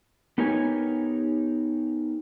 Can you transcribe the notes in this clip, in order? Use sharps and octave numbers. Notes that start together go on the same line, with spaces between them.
B3 D#4 G4 A#4 C#5 G#5